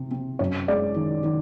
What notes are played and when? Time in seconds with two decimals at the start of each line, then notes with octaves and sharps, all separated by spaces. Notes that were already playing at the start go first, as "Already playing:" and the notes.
Already playing: C3 C4
0.11 C4
0.39 F#2 C#5
0.68 G#3 D5
0.96 D#3
1.24 D#3